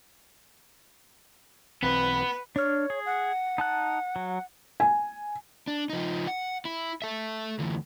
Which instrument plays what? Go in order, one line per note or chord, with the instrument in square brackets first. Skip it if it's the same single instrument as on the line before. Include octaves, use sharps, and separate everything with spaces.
[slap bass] B1 E3 C4 [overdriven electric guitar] B3 [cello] B4
[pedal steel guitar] D4 F6 [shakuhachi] C#5
[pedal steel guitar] G#4
[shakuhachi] F#5
[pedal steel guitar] D#4 A5 F#6
F#3
[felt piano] G#5
[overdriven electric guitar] D4
F3 D#4
F#5
E4
A4 E5
D2 E3